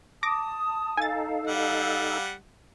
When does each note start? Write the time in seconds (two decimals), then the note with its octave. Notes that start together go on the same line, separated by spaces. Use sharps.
0.23 A5 D6 D#6 A#6
0.97 D#4 A4 F5 G#5 A6
1.47 G3 F#5